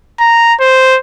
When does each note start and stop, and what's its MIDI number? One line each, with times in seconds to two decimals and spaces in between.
0.20 0.54 82
0.60 0.98 72